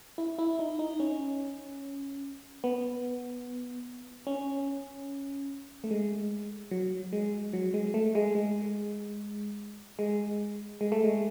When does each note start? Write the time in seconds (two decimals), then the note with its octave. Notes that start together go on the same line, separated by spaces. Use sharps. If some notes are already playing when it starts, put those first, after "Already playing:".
0.18 E4
0.38 E4
0.59 D#4
0.79 D#4
1.00 C#4
2.64 B3
4.27 C#4
5.84 A3
5.91 G#3
6.71 F#3
7.13 G#3
7.53 F#3
7.74 G#3
7.94 A3
8.15 G#3
8.35 G#3
9.99 G#3
10.81 G#3
10.92 A3
11.04 G#3